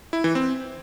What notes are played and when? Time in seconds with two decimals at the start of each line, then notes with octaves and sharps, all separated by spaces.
0.13 E4
0.24 E3
0.35 C4